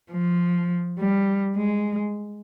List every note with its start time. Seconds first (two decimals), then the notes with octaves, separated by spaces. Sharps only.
0.11 F3
0.98 G3
1.56 G#3